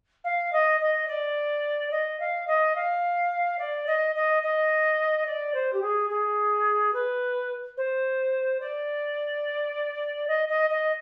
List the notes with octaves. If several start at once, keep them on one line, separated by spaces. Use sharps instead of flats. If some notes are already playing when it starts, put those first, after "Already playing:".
F5
D#5
D#5
D5
D#5
F5
D#5
F5
D5
D#5
D#5
D#5
D5
C5
G4
G#4
G#4
B4
C5
D5
D#5
D#5
D#5